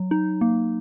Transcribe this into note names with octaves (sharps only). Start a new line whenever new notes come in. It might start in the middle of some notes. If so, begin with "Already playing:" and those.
Already playing: F#3
D#4
A#3